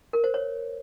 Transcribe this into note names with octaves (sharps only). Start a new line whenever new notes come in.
A#4
C5
C#5